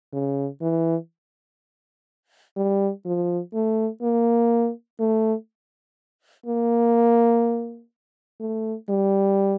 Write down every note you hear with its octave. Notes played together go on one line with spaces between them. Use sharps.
C#3
E3
G3
F3
A3
A#3
A3
A#3
A3
G3